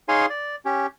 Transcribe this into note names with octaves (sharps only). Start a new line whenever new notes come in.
D#4 G#4 C#5 F5 G#5 C6
D5
C#4 G4